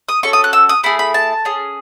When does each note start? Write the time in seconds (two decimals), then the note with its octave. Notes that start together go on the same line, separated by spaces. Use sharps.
0.09 D#6
0.23 C#4 F#4 A4 C#6
0.33 D#6
0.44 F#6
0.53 E6
0.69 D#6
0.84 A3 E4 G#4 B5
0.99 B5
1.14 A5
1.45 C#4 G#4